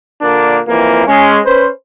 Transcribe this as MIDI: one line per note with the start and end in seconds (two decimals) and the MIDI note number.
0.22 0.60 46
0.22 0.60 50
0.22 0.60 58
0.22 0.60 62
0.68 1.06 41
0.68 1.06 52
0.68 1.06 58
1.06 1.38 56
1.06 1.38 61
1.45 1.69 61
1.45 1.69 71
1.45 1.69 72